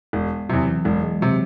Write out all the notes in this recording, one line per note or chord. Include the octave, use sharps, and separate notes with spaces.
E1
E2 C3 F#3
E3
E1 G#3
G#3
C3 F#3